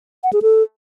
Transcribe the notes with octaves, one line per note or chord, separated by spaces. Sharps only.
F#5
G#4
A4